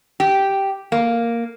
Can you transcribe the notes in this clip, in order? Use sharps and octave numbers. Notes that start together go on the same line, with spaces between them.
G4
A#3